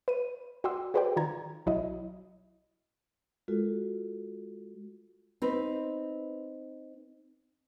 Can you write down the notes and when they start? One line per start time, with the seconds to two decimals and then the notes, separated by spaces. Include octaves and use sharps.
0.08 B4 D#7
0.64 F#4 D5 G5 C6 D#6 E6
0.94 F#4 G#4 B4 C5 D5 G5
1.16 D#3 F4 A#5 G#6
1.66 B1 F#3 E4 D#5
3.48 G#3 F4 F#4 A4 A#4
5.42 C4 D#4 B4